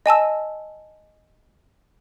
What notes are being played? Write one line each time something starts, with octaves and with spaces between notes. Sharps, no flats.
D#5 G#5 A5 E6